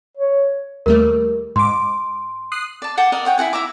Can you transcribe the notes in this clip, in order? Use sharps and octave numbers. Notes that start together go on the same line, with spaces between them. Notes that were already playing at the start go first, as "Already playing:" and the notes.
C#5
D#2 G3 A3 A#4
G#2 C6 D6
D#6 F#6 C7
D5 A5
F#5 G5 A5 D6
A#4 D5 D#5 F#5
C#5 F#5 G5
E4 F#4 F#5 G#5
E4 E5 A#5 D6